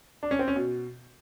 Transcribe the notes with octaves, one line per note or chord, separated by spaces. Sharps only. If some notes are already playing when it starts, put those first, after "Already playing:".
D4
C#4
C4
C#4
B2